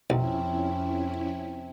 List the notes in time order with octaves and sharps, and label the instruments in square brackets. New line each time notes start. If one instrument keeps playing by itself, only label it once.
[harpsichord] B1 [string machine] F2 C#4 E4 [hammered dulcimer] C3